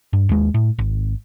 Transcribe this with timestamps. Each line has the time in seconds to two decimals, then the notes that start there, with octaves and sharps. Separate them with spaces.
0.13 G2
0.29 D#2 G#3
0.54 A2
0.79 G#1